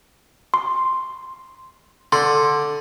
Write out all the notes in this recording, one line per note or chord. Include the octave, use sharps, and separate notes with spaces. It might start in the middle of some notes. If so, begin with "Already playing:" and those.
C6
D3 C6